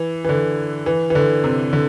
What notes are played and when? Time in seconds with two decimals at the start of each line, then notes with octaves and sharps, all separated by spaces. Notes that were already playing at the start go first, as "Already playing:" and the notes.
Already playing: E3
0.24 E3
0.29 D3
0.86 E3
1.10 E3
1.15 D3
1.44 C3
1.73 D3